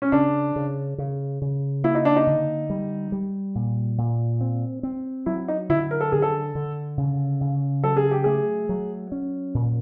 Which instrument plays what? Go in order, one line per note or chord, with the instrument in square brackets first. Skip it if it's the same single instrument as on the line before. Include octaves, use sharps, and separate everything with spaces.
[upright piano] C#4
[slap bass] C#3 [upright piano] D4
[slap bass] C#3
C#3
C#3
[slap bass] A#3 [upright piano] E4
[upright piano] D#4
D4
D#4
[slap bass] D3
G3
G3
A#2
A#2
C4
C4
[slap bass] F#3 [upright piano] E4
[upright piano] D#4
[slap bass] D3 [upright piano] E4
[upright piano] A#4
A4
[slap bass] D3 [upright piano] G#4
[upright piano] A4
[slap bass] D3
C#3
C#3
[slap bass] F#3 [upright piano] A4
[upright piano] G#4
G4
[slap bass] A3 [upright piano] G#4
[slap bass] F#3
C#4
A#2